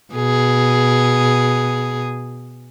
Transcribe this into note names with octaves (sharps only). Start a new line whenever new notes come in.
B2 G#4